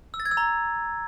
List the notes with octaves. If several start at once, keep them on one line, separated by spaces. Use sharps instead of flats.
E6
A6
G#6
E6
A#5